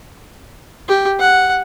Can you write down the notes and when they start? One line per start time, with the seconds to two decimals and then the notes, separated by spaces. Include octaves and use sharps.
0.88 G4
1.19 F#5